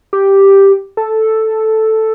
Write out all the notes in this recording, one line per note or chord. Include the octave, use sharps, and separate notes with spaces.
G4
A4